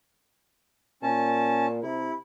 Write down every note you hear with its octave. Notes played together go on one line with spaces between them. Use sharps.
A#2 C#4 A5
C3 E4